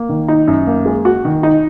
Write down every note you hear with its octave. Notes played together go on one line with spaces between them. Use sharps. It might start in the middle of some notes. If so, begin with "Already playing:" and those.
Already playing: A#3
D#3
D#4
F#2
A#3
G#3
F#4
D#3
D#4